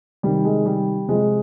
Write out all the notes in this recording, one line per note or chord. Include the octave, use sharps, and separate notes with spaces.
C3 D#3 G3
G#3
G3
C3 F3 G#3